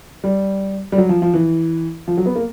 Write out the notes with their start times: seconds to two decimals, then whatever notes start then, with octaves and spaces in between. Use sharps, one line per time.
0.24 G3
0.92 G3
0.98 F#3
1.09 F3
1.22 F3
1.34 E3
2.08 F3
2.17 F#3
2.26 B3
2.36 A#3